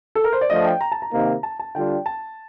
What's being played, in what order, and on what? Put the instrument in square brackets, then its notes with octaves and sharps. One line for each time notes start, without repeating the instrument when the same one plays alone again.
[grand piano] A4
A#4
C5
D5
[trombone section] F3 A3 D4 [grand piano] D#5
[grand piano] G5
A#5
A5
A#5
[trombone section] C3 D#3 A#3 D#4
[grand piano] A5
A5
[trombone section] D3 G3 D4 F4 [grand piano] G5
[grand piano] A5